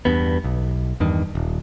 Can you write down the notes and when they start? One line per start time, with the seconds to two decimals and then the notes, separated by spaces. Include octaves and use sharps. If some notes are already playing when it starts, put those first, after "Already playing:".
0.05 E2 G2 B3
0.44 B1
1.00 E2 G2 D#3
1.35 D#1